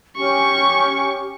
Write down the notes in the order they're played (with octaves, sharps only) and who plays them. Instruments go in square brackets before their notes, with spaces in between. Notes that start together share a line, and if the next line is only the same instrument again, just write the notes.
[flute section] C#4 G4 [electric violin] C#6